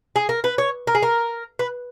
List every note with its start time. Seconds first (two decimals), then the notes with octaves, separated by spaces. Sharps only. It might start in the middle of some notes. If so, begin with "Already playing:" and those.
0.16 G#4
0.29 A#4
0.44 B4
0.58 C#5
0.87 A#4
0.95 G#4
1.03 A#4
1.59 B4